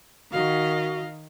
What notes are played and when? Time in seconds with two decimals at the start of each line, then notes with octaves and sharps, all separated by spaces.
0.32 D#3 F#4 D#5 F5